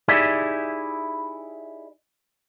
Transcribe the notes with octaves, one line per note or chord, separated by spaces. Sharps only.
D#4 E4 G4 G#4 D5 E5